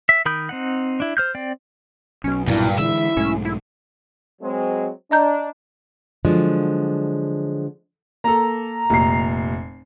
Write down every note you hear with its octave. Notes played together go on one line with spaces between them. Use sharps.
E5
D#3 A#4 B5 D#6 G6
C4 D#4 F#5
D4 E4
C5 F6 G6
C4 D5 G5
B1 B2 C#4
E2 G2 A#2 E4
D3 E3 G#3 E4 E5
B1 G#2 A3 C#4
E4
F#3 G#3 C4
D4 D#5 A#5 G6
D3 F3 F#3 G#3 D4
A#3 A4 A#5
F1 A#2 C7